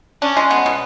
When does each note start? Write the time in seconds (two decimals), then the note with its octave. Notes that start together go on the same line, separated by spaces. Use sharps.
0.22 C#4 D4
0.37 G#3
0.51 B3
0.66 B2